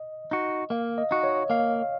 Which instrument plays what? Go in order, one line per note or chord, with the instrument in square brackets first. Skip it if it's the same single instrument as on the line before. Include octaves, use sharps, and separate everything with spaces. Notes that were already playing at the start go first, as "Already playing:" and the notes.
Already playing: [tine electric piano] D#5
[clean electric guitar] D#4 F#4
[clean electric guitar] A#3 [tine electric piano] F5
[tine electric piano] D#5
[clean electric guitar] D#4 F#4
[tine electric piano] C#5
[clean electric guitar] A#3 [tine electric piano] F5